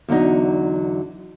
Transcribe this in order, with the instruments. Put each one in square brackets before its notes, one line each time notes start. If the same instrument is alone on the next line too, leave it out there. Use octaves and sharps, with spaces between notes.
[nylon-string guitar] E2 D3 F#3 D#4